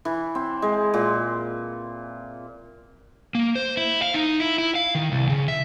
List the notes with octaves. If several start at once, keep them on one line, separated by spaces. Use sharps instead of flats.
E3
C4
G#3
A#2
A#3
C5
E4
F5
D#4
E4
E4
F5
D#3
C2
C#3
E5